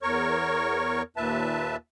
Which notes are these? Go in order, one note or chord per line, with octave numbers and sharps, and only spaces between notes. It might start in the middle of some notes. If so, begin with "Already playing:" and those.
E2 A#4 C#5 C#6
D#2 A#2 B4 E5 A5